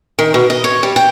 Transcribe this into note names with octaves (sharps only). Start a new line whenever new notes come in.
D#3
B2
D#5
C#5
G3
G5